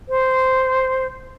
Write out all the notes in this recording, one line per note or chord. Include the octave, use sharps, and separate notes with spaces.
C5